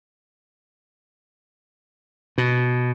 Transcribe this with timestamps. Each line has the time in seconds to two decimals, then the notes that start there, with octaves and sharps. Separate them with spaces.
2.38 B2